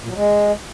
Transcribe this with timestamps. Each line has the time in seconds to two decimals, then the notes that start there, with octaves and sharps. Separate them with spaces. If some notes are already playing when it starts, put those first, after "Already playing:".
0.01 A#2
0.09 F#3
0.16 G#3